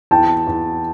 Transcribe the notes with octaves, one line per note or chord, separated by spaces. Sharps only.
E2 G5 A5
E2